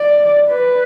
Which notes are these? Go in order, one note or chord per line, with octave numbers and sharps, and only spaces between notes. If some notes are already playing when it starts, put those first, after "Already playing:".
Already playing: D5
B4